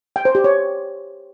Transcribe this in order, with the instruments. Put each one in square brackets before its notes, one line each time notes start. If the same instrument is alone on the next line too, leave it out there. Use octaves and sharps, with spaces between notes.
[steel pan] G5
C5
G4
C#5